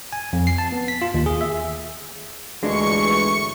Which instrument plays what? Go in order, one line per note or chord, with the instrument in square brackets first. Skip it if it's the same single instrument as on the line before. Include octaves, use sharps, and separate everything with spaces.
[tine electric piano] G#5
F2
C7
A5
B3
B6
F4
D#2
G#4
E5
[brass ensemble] G1 D2 E3 [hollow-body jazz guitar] G#3 D4 [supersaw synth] C#6 C#7